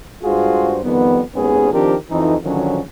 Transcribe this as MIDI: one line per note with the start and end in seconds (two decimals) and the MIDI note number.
0.24 0.78 43
0.24 0.78 56
0.24 0.78 65
0.24 0.78 66
0.24 0.78 68
0.24 0.78 72
0.83 1.21 41
0.83 1.21 51
0.83 1.21 55
0.83 1.21 59
1.35 1.71 32
1.35 1.71 39
1.35 1.71 56
1.35 1.71 59
1.35 1.71 61
1.35 1.71 68
1.72 1.95 51
1.72 1.95 53
1.72 1.95 60
1.72 1.95 62
1.72 1.95 67
1.72 1.95 70
2.10 2.35 41
2.10 2.35 52
2.10 2.35 63
2.44 2.82 32
2.44 2.82 50
2.44 2.82 51
2.44 2.82 53
2.44 2.82 54
2.44 2.82 61